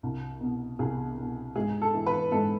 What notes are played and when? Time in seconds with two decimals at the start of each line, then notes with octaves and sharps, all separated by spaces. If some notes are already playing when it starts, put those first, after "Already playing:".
0.03 C2
0.41 B2
0.79 C2 G#4
1.18 B2
1.56 G#2 G#4
1.82 A4
1.94 E3
2.06 B4
2.32 G#2 A4